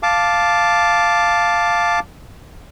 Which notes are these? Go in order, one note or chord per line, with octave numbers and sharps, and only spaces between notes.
F5 A5 D6